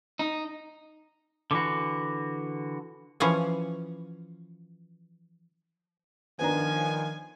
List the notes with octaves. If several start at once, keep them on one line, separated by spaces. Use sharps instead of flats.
D#4
D3 E3 F#4
E3 F3 C#4 F5 F#5 G#5
D#3 F3 B3 D4 G#5 A#5